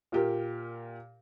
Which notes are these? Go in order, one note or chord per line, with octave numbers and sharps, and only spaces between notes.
A#2 G4 A#4